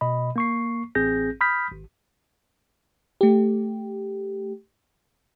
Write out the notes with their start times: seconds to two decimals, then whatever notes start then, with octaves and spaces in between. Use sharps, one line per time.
0.01 B2 D#5 B5
0.36 A#3 C#6 C7
0.95 A1 C4 G#4 G6 A#6
1.41 B5 D#6 F6 G6 B6
1.72 G#1
3.21 A3 G4